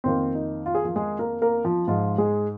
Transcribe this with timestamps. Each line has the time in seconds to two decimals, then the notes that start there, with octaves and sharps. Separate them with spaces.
0.04 F2 D#3 A#3 C4
0.35 D#4
0.66 F4
0.75 G#4
0.84 F3 F4
0.96 G#3 G#4
1.19 A#3 A#4
1.42 A#3 A#4
1.64 F3 F4
1.88 G#2 F3 G#3 F4
2.18 G#3 G#4